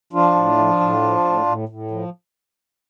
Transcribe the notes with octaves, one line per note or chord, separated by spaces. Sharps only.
F3 D4 F4
A2
F3
A2
F3
A2
A2
A2
F3